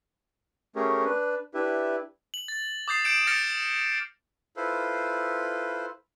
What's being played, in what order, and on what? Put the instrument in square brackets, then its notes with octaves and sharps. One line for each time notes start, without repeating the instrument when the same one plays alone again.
[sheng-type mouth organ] A3 C#4 G4 G#4 A#4 C#5
D4 B4
D4 E4 G4 B4 E5
[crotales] F#7
A6
D6 D#6 G6 A6 C7
G6 C#7 D7 E7
D#6 F6 G6 A6 A#6 C#7
[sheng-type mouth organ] E4 F4 A4 B4 C5